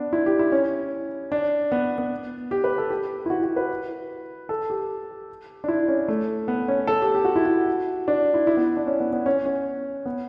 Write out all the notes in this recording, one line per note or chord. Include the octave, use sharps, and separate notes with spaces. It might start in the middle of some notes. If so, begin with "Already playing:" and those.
Already playing: B3 D4
E4
G4
E4
C#4
D4
B3
B3
G4
B4
A4
G4
E4
F#4
F#4
B4
A4
G4
D4
E4
C#4
A3
B3
C#4
A4
G4
G4
F#4
E4
F#4
D4
E4
E4
B3
D4
C#4
B3
B3
C#4
C#4
B3